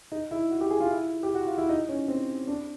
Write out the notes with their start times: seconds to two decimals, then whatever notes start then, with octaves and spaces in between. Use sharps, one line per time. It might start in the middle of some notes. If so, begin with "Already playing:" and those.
0.12 D#4
0.31 E4
0.51 F#4
0.61 G4
0.70 G#4
0.80 F4
0.90 E4
1.23 G4
1.34 F#4
1.46 F4
1.58 E4
1.69 D#4
1.89 C#4
2.08 C4
2.48 D4